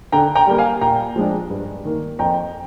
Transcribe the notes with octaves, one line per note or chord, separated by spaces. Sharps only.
D3 G5 A#5
G5 A#5
G3 A#3
F5 G#5
A#2 G5 A#5
F3 G#3 D4
G2
D#3 A#3
F2 G5 A#5